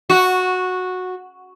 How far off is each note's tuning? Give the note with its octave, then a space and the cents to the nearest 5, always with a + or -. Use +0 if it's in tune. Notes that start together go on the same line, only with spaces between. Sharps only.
F#4 -10